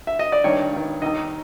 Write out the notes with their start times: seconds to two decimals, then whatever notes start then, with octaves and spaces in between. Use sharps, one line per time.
0.07 E5
0.19 D#5
0.32 D5
0.44 G2 D#3 C#5
0.73 G2 D#3
1.02 D#2 D#3 D#5